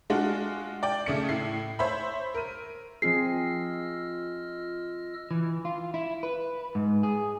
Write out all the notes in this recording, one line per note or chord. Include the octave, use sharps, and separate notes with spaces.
G#3 D4 F4 F#4
D5 G5
C#3 A3 C#7
A2 E4 C7
C5 C#5 E5 B5
A#4 D#7
F3 C4 F4 G#4 D#5 E6 F6 C7
E3
F4
E4
B4
G#2
G#4